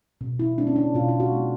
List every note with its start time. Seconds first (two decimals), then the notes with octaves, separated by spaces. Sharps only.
0.21 B2
0.39 E4
0.58 G#3 B3 D4
0.67 C#4
0.76 D4
0.94 B2 F4
1.09 F4
1.20 F#4
1.33 G#3 B3